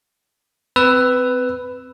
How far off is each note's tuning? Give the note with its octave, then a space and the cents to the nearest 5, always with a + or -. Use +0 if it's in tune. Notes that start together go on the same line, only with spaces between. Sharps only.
C4 -25 B4 +10 E6 +0